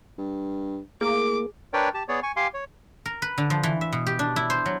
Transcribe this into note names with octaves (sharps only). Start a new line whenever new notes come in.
G2
A2 A#3 G#4 D6
D4 A#4 B4 C#5 D5 G5
G4 A5
B3 G#4 C#5 D5
G#5 C#6
G4 F5 G#5 C6 D6
C#5
A#4
B4
D3
F3
E3
E5
B2
G4
D4
E4
C5
F#3